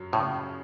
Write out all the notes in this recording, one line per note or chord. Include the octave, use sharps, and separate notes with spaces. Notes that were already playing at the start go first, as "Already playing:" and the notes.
Already playing: F#2 F#3
A2 C#3